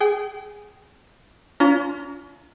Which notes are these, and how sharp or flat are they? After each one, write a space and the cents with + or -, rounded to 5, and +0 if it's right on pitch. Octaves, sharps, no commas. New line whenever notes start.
G#4 +0 G5 -30
C#4 +45 F4 +0 A#5 -5